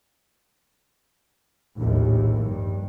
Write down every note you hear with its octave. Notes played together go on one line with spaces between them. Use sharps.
A#1 D#2 A2
G2